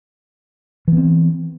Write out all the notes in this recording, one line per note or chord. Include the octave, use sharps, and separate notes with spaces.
E3 B3 C4